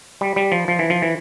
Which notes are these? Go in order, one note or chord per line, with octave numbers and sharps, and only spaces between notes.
G3
G3
F3
F3
E3
F3
E3